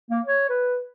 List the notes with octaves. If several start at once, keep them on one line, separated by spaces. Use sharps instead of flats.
A#3
C#5
B4